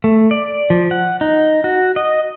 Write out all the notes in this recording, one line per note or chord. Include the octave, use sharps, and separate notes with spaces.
A3
D5
F3
F#5
D#4
F#4
D#5